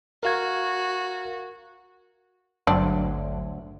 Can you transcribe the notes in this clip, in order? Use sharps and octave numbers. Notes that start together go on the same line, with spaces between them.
F#4 A#4 F5 G#6
G#1 D2 G2 D3 F#3 C4 D4 C#5